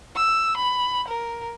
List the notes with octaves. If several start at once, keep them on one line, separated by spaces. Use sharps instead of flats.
E6
B5
A#4